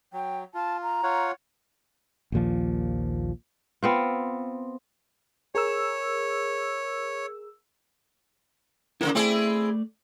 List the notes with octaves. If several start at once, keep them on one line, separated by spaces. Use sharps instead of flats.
F#3 G5
F4 A5
A#5
F4 C#5 F#5
A#1 D#2 A#2 F3
B3 C4 F4
G#4 A#4 C#5 E6
C#3 F3 A#3 E4 A#4 C5
A3 C4 E4 G#4 D5